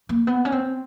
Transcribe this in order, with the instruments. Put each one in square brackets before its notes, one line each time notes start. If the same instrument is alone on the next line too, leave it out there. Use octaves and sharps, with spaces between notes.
[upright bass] A#3
B3
C#4
C4